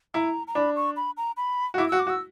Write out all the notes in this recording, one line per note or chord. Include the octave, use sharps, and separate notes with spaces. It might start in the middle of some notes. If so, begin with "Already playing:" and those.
E4 A#5
A#5
D4 B5
C#6
B5
A#5
B5
F#4
E4 D6
F#4 E6
D6
F#4
E6